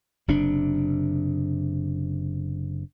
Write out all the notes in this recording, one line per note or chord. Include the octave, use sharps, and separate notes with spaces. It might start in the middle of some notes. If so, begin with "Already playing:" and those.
F#1 C3 D4